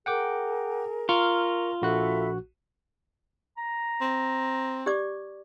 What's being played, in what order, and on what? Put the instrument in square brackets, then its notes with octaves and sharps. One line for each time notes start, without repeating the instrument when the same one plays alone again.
[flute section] G#4 A#4 [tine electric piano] F#5 G5 D6
[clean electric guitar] F4 [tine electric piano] A#4 C#6 F6 [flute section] A#5
[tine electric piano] A#1 F#4 F#6 [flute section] A4 E5 B5
[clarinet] A#5
[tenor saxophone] C4
[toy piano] G4 D5 D6